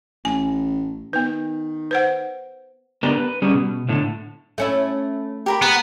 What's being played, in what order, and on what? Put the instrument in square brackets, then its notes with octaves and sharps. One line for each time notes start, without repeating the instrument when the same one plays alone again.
[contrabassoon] A1 [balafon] G#5
[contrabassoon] D#3 [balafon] B3 B4
[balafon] B4 C5 F#5
[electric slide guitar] D3 B3 D4 G4 A#4 B4
B4
G3 C#4 G#4
B2
A2 D3
[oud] A3 C#4 E4
[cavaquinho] G4 A#4 B5
[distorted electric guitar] B3 [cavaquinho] A#5